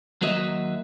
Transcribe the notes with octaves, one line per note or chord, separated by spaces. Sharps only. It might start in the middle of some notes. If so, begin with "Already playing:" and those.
D#2 F#3 A#3 F#4 D#5 E5